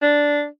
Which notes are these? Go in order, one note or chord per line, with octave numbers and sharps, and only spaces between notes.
D4